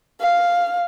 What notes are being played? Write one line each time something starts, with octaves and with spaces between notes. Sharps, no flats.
F5